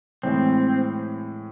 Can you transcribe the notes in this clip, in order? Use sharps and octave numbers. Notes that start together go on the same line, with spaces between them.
A2 E3 G#3 C4